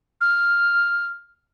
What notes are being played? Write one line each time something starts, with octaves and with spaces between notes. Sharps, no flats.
F6